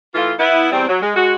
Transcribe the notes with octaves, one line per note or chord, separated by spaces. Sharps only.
E3 A3 F4
B3 E4
E2 G3 C4
F#3
G#3
G#3 F#4